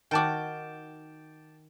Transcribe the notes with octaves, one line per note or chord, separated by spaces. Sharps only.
D#3 F#4 G5 A5 D6